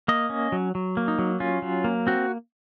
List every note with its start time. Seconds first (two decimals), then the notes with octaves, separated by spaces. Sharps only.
0.08 A#3 D#5
0.30 C#4
0.52 F#3
0.75 F#3
0.97 A#3
1.08 D#4
1.19 F#3
1.40 C#4 F4
1.62 F#3
1.84 A#3
2.07 C4 F#4